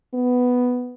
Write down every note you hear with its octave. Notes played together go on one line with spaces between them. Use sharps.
B3